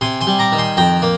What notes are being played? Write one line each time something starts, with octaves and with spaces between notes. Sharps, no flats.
C3 G#5 C6
G#5 C6
G3
A#5 D6
D#3
G#5 C6
F2 G5 A#5
A#3